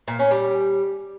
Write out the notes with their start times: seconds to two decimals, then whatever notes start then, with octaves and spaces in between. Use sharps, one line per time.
0.08 A#2
0.19 C#4
0.31 G3